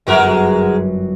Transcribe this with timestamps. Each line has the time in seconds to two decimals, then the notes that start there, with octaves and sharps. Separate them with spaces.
0.07 G1 F#2 G#3 F#4 A#4